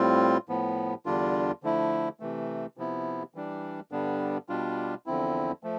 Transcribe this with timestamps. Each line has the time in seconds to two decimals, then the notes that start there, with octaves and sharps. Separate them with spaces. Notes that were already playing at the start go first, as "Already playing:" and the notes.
Already playing: A2 G3 C4 F4
0.49 A2 F3 B3
1.06 E2 D3 G3 D4 F4
1.63 D3 F3 A3 E4
2.20 C3 E3 A3
2.77 C3 F3 B3 E4
3.34 E3 G3 D4
3.92 G2 D3 G3 B3 D4
4.49 B2 G3 D4 F4
5.06 E2 D3 F3 C4 E4
5.63 F3 A3